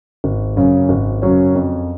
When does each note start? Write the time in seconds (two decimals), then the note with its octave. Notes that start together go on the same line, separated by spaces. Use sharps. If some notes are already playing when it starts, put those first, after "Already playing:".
0.24 G#1
0.56 F#2 C#3 F#3 C#4
0.89 G#1
1.22 F#2 C#3 F#3 C#4
1.55 F2